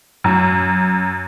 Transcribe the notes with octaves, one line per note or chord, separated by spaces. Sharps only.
F#2